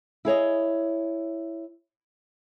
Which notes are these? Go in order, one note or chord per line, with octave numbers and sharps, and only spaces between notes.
E4 G#4 C#5 D#5